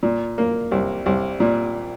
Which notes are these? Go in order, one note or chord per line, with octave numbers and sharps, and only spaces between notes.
A#2
A#3
C2
C2
A#2